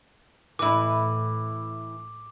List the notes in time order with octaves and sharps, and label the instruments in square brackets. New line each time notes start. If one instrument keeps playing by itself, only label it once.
[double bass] A2 [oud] E3 E4 [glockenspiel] D6